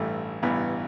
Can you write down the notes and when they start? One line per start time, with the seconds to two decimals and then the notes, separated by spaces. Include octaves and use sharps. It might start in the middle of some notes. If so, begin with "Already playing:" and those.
Already playing: A1 G2 E3 A3
0.42 A1 G2 E3 B3